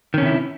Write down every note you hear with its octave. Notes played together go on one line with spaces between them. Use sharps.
C3 D#3 C#4 E4